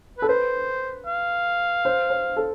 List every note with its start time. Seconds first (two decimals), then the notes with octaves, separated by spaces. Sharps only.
0.18 A4 B4
0.29 B4 C5
1.06 F5
1.85 C5
2.10 C5
2.37 A4